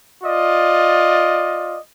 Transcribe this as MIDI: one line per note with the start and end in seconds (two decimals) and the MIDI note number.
0.24 1.78 65
0.24 1.78 74
0.24 1.78 75